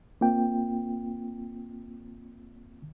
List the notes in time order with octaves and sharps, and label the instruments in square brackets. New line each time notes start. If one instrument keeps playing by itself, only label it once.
[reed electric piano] A#3 C4 F4 G5